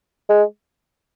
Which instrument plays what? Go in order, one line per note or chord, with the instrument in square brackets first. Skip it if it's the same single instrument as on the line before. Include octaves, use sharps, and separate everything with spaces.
[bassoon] G#3